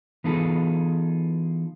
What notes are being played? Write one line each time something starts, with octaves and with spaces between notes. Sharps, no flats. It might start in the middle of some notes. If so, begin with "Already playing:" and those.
E3 B3 D#4 F4 G#4 A4